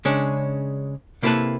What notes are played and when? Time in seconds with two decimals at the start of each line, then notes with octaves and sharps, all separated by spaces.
0.05 C#3 G#3 C#4 D4
1.23 C3 A#3 E4 G4 A4 B4